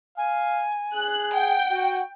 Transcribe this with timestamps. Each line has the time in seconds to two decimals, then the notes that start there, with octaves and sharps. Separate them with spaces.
0.17 F5 G#5
0.94 G#4 F#6
1.35 F#5 G5
1.71 F#4